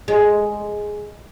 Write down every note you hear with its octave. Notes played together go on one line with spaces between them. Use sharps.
G#3